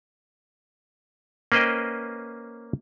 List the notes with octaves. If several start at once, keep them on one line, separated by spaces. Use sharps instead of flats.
A#3 C#4 B4 C5 D#5 G5